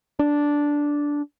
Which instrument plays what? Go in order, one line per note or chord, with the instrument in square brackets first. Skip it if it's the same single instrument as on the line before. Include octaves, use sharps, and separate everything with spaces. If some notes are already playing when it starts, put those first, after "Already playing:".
[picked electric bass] D4